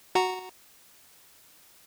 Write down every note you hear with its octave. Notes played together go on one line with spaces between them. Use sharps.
F#4 F#5 A#5